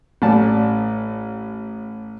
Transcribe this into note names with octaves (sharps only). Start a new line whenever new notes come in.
A1 A2 C#4 D5 A5